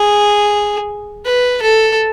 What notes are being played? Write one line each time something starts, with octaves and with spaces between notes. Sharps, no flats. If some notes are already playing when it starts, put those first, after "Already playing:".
Already playing: G#4
B4
A4